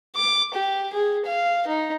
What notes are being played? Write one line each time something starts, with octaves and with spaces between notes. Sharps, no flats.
D6
G4
G#4
F5
D#4